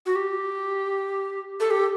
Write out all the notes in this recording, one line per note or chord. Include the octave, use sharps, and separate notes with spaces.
F#4
G4
A4
G4